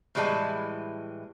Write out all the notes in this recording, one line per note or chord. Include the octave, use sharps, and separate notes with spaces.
A2 E3 G3 G#3 D#5 A5